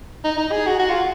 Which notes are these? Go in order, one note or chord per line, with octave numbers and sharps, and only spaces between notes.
D#4
D#4
G#4
F#4
F#4
F4